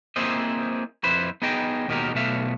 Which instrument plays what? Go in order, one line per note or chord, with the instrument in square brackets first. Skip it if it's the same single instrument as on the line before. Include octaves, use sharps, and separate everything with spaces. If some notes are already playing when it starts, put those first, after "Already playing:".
[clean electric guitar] A#3 C4 E4 G#4 C5 D#5
F2 E4 B4 C5 B5
B3 D#4 G#4 D#5 G5
D#2 B2 D#3 G#3 G4 A#4
B1 B2 A3 E5 F5